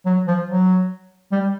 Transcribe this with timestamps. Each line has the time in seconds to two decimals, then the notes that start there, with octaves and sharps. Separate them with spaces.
0.06 F#3
0.27 F3
0.48 F#3
1.32 G3